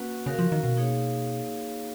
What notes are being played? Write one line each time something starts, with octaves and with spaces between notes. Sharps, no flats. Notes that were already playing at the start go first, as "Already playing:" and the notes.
Already playing: A#3 C#4 F#4 B4 F#5
C#3 C#4 F#4 A#4 F5
F3
D#3
B2
A#3 D#4 G#4 C#5 F5